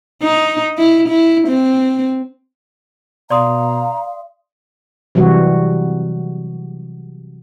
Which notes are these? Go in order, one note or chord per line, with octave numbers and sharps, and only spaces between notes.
D#4
E4
E4
C4
B2 D5 F5 A#5 C6 D#6
C3 E3 F#3 G3 F#4